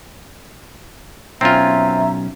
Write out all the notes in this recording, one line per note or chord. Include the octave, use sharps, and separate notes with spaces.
B1 C4 C#4 F4 E5 A#5